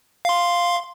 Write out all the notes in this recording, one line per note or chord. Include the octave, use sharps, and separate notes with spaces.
F5 C6